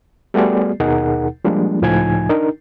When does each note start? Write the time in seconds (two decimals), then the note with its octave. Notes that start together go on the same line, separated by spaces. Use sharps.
0.34 G3 A3 B3 F#4 G#4 D5
0.80 D#2 B2 D#4 G#4 A#4 F#5
1.45 F3 G3 G#3 A#3 D4
1.82 C#2 A2 F3 D#4 G#5 G#6
2.29 D4 D#4 A#4